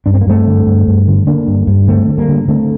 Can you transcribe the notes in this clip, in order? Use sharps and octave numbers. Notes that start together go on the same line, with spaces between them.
G2 D4
C4
A#3
G2 A3 C4
D3
G2
G2
D3
D3 A#3 D4
G2
G2
D3 A3 C4
D3
G3 A#3
D3
D3 A3 C4